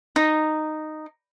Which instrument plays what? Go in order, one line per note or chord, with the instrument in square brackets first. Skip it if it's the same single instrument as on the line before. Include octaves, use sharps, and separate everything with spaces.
[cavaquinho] D#4